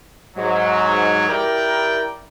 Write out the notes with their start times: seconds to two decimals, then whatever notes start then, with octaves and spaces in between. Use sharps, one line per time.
0.37 G#2 F#3
1.29 E4 G4 A#4 D5 G5